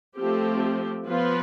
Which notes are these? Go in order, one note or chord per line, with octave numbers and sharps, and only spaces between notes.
F3 A3 C4 G4
F3 B3 F4 B4